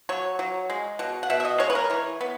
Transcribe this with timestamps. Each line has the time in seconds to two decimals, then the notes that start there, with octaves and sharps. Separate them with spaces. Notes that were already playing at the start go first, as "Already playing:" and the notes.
0.09 F#3 C#5
0.39 F#3
0.70 G#3
0.99 B2
1.23 F#5
1.30 B2 E5
1.40 E5
1.45 D#5
1.60 G#3 C#5
1.70 B4
1.75 A#4
1.90 E3 C#5
2.21 B3